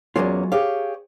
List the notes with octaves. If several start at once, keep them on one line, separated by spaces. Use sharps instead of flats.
E2 F#3 G#3 A#3 C#4 F4
G4 G#4 C#5 F5